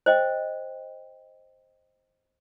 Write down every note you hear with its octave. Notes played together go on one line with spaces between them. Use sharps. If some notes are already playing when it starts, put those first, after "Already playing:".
C5 D#5 G5